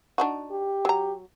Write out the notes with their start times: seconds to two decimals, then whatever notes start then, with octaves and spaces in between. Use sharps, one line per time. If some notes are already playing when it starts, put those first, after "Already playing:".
0.18 D4 D#4 F#4
0.51 G4
0.85 F#3 A#5